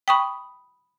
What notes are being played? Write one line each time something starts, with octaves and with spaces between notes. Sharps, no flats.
G5 B5 C#6 D#6 B6